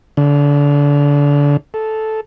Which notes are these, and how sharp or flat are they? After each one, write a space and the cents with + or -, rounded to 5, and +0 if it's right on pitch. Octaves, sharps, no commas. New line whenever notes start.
D3 -30
A4 -10